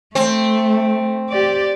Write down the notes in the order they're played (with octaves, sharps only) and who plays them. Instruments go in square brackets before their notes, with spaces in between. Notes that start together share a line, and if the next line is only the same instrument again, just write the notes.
[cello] A3 [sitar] C4
[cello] G4 D5